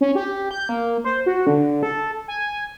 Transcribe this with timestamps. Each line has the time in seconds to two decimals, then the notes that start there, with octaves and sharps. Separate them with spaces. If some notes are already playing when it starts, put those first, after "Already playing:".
0.01 C#4
0.15 G4
0.51 G6
0.69 A#3
1.04 C5
1.26 F#4
1.47 D3
1.83 A4
2.28 G#5